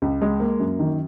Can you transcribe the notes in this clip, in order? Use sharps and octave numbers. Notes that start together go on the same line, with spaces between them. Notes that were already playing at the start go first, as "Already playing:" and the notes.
C#2
G#3
A#3
F#2
D#3